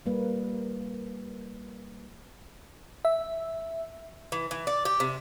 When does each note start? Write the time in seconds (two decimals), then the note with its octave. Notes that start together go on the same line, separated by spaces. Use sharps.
0.06 G3 A#3 A#4 B4
3.05 E5
4.32 E3
4.51 E3
4.67 D5
4.85 G4
5.00 C3